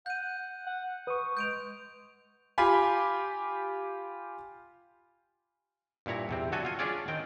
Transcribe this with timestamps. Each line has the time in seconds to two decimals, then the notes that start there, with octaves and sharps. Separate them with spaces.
0.06 F#5 G6 D#7
0.67 F#5
1.07 B4 C#6 D#6
1.37 G#3 G6 D7 F7
2.58 F4 G4 G#5 B5
6.06 G2 A#2 E4 C#5 A#5
6.29 E2 C3 C4
6.52 D3 F#3 F#4 A4 G#5
6.65 F4 G#5
6.79 C#4 D4 F4 G#4 C#5 D5
7.08 D#3 C4 G5